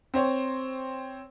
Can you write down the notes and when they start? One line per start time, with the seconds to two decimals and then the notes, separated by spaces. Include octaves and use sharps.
0.14 C4 C5 C#5